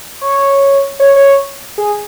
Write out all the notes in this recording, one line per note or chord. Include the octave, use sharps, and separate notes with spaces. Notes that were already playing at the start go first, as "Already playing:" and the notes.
C#5
C#5
C#5
G#4